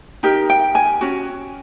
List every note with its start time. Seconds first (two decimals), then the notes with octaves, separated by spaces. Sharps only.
0.23 D#4 G4 A#4 G5
0.50 G5
0.75 G#5
1.01 C#4 F#4